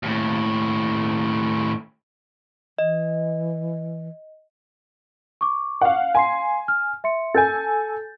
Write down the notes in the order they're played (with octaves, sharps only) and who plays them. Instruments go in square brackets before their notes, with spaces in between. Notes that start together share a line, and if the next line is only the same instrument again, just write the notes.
[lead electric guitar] D#2 A2
[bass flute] E3 [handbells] D#5
[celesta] C#6 D6
[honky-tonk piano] F5 F#5
[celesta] F5 C6 C7 [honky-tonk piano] G#5
[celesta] F6
E5 C6 C#7
[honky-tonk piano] A4 G#5 [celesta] G6 A6